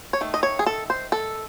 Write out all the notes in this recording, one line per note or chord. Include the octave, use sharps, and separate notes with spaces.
C#5
D#3 A3
D#5
C#5
G#4
A4
C5
A4